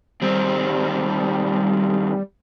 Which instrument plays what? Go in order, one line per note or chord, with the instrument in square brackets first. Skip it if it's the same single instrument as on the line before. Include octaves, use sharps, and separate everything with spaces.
[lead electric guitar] D#2 C4 [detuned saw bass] G3